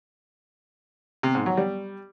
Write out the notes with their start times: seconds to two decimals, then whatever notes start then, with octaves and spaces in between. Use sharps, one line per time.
1.23 C3
1.35 G#2
1.46 F#3
1.57 G3